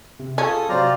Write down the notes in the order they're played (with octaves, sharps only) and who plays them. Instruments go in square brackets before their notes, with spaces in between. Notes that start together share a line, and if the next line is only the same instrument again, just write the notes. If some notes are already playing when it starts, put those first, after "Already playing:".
[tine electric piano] C3
[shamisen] C#4 [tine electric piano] F4 G#4 [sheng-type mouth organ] A4 D#6
[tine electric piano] C3 F#3 [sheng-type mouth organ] C4 C5 F6 [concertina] F4 D5 A#5